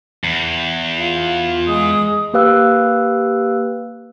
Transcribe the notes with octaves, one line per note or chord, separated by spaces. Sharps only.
E2
F4
G#3 D#6
A#3 G4 B4 F5 E6 F#6